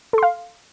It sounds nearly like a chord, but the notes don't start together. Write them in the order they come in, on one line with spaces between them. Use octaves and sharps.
A4 C6 F5